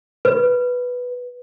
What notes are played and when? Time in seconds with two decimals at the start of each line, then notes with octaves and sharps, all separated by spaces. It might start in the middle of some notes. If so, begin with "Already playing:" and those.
0.25 B4